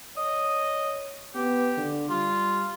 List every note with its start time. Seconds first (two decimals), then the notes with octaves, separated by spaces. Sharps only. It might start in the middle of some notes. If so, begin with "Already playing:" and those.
0.17 C#5 D#5
1.35 B3 G4
1.78 D3
2.10 G3 F4